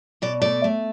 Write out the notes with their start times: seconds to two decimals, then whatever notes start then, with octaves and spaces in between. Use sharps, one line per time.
0.22 B2 D5
0.42 A3 D5
0.64 A3